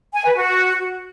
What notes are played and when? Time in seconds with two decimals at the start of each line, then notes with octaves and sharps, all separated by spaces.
0.14 G#5
0.25 B4
0.36 F#4